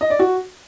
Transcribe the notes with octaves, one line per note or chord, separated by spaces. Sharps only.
D#5
D5
F#4